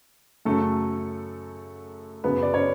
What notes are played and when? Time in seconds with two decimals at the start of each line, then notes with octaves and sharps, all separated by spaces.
0.45 F#2 C#3 F#3 A3 A4
2.24 F#2 C#3 F#3 B3 B4
2.43 D5
2.53 C#4 C#5